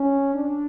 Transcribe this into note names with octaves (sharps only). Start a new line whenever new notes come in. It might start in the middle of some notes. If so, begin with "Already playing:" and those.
Already playing: C#4
D4